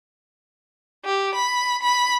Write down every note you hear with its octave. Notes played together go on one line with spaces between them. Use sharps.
G4
B5
B5